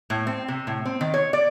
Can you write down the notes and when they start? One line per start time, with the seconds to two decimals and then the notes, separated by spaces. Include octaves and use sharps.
0.10 A2
0.27 C4
0.48 C3
0.67 A2
0.85 C4
1.01 D#3
1.14 C#5
1.33 D5